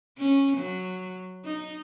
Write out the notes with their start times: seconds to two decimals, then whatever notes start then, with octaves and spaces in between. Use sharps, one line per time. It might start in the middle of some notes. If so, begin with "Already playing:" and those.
0.18 C#4
0.58 F#3
1.45 D#4